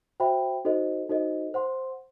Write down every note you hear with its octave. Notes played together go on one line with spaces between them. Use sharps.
F#4 C5 E5 G5 B5
D#4 F#4 A4 C5 D#5
D#4 F#4 A4 C5 D#5
C5 F#5 C6